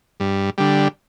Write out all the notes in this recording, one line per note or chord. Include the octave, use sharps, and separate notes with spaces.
G2
D3 G3